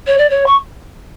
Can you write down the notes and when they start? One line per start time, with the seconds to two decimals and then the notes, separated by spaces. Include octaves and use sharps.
0.06 C#5
0.17 D5
0.29 C#5
0.46 C#6